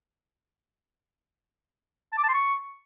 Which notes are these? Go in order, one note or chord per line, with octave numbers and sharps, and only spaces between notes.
A5
D6
A5
C6
C#6